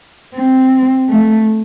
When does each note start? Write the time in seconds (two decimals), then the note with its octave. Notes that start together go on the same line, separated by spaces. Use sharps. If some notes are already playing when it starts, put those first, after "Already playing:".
0.35 C4
1.10 A3